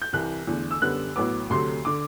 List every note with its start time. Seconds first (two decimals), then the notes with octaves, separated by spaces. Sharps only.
0.02 G6
0.13 C2 C3 E3 F#6
0.47 E2 D3 A3
0.71 E6
0.81 F#2 D3 G3 B3 F#6
1.16 A1 A2 F#3 B3 D6
1.50 D2 C3 F#3 A3 C6
1.85 D3 D6